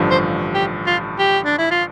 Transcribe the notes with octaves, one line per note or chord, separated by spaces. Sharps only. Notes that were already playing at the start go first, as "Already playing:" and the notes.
Already playing: A1 G2 D3 F3
C5
G4
F4
G4
D4
E4
F4